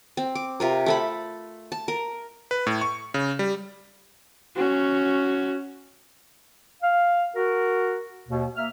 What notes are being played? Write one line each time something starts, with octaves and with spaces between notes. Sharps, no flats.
C4
D6
C3 F4 A#4
A3 A4 B5
A5
A#4
B4
A2
C#6
C#3
G3
C#4 F#4
F5
F#4 A#4
D#2 B2
A#3 E5 F6